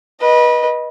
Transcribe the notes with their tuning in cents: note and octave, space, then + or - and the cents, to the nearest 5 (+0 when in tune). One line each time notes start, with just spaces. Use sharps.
B4 -25 D#5 +0